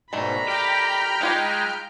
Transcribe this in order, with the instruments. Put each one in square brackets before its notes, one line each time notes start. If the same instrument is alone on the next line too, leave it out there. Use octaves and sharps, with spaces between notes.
[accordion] G#2 B2 [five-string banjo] D#3 A3 D4 [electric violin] A#5 B5
[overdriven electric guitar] G4 [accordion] G5 F6 G6
[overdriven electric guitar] G#3 [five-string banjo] D#4 F4 G4